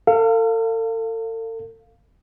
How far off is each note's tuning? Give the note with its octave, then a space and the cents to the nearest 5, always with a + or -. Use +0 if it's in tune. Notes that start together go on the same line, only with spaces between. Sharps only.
A4 +40 F5 +0